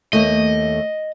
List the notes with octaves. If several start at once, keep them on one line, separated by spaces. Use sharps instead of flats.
D#2 A3 D#5